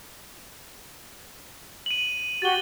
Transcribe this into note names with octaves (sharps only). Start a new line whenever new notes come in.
D#7 F#7
F#4 G4 A6 G7